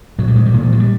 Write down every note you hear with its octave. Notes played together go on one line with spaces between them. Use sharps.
A#2 F#3
G3
G#3
G3
A#2 G#3
F3
F#3
G3